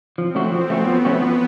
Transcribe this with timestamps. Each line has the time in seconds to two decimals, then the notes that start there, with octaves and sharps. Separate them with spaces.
0.18 F3 C4
0.35 A3 C#4 F#4
0.52 F3 B3
0.70 A3 C#4 F#4
0.87 F3 B3
1.05 A3 C#4 F#4
1.22 F3